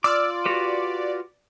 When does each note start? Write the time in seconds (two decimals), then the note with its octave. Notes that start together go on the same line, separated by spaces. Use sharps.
0.04 F4 D5 D6 E6 F6
0.46 F#4 G4 B4